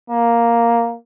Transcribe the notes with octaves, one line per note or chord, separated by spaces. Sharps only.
A#3